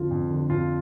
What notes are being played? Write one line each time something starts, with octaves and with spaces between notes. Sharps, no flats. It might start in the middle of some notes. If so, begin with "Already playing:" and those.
Already playing: F2 D3 F3 F4
F2
D3 F3
F2 F4